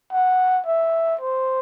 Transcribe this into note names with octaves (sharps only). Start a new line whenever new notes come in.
F#5
E5
C5